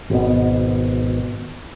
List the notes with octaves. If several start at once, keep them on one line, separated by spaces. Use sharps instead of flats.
G#1 B2